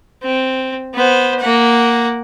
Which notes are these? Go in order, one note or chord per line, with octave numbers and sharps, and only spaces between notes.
C4
B3 C5
A#3 F#5